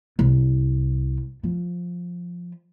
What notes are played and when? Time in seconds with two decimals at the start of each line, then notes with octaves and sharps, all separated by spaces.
0.19 C2
1.43 F3